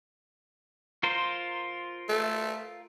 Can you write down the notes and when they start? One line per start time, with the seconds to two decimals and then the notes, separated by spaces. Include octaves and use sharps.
1.03 F4 A#4 C5
2.09 A3